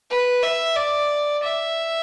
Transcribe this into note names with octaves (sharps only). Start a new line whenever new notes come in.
B4
E5
D5
E5